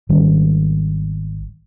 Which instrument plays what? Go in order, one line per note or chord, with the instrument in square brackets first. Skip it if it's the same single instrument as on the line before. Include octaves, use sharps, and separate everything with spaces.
[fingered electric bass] G#1 D#3 G3 C#4